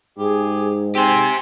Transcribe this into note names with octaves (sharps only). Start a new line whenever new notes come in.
G#2 G4 G#4
C4 G4 C5 G#5